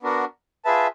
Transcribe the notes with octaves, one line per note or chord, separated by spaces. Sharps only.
B3 D4 F#4 A#4
F4 G#4 B4 E5 A5